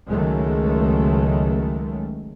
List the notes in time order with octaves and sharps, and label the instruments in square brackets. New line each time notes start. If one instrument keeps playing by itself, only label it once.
[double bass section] C#2 D#3 F#3 G#3 A3